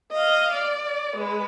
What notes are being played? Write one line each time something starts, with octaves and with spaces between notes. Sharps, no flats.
D#5 F5
D5
G#3 B4